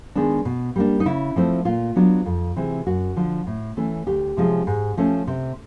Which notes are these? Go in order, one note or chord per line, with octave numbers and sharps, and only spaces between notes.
D#3 G#3 B3 D4
B2
G3 A#3 D4
D#4
C#3 E4
F3 A3 C4
A#2 F4
F#3 B3 D4
F2
C3 E3 G#3 C4
F#2 F#4
D3 F3
A2
E3 A3 C#4
D2 G4
C3 F3 G#3 C#4
G#2
F3 A3 C#4
C3